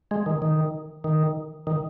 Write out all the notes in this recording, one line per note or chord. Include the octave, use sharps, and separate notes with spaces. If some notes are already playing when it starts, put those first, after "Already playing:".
G#3
D#3
D#3
D#3
D#3